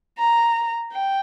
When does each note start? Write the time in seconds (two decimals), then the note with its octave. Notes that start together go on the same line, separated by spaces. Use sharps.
0.18 A#5
0.92 G5